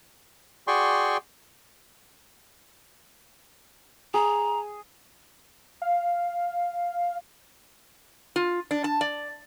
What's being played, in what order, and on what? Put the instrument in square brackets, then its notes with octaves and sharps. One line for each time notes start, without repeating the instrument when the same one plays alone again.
[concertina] F#4 G#4 D5 G5 C6 C#6
[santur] G#4 [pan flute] A#5
[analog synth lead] F5
[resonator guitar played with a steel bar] F4
D4
A5
D5